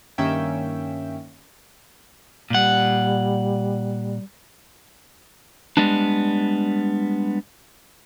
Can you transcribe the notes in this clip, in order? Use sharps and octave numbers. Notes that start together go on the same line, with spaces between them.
G2 D#3 A#3 C#4 E5 G5
A#2 G3 F#5
G3 G#3 B3 D4